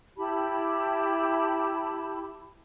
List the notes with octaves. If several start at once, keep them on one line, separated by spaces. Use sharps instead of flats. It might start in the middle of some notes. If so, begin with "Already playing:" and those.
E4 G4 A5 B5